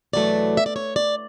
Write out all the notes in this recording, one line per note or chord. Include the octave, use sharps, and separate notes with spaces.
E2 B2 F#3 A3 D5
E5
D5
C#5
D5